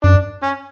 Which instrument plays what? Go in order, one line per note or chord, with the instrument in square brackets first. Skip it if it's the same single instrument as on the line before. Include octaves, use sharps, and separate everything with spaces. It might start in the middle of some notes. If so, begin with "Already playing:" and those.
[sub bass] F#2 [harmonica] D4
[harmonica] C#4